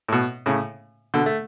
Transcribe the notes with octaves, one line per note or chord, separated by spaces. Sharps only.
A2
B2
A2 C#3
B2 D3
A3